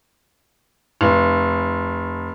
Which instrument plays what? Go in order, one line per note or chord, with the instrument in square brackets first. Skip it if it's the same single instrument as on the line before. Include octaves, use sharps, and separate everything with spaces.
[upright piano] F1